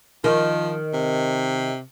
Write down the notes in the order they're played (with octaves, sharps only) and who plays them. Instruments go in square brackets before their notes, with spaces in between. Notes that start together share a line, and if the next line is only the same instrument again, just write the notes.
[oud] D#3 [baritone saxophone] F3
[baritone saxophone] C3